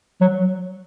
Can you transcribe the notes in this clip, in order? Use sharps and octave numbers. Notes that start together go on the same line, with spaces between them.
F#3